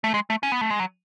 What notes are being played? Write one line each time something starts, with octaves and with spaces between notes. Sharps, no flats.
A3
G#3
A3
C#4
B3
A3
G#3
F#3